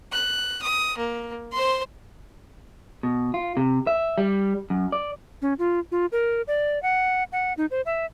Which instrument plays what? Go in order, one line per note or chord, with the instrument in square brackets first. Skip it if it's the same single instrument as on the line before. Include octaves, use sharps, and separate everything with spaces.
[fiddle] F#6
D#6
A#3
C5 C6
[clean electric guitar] B2
F4
C3
E5
G3
F#2
D5
[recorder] C#4
F4
F4
A#4
D5
F#5
F#5
D#4
C5
E5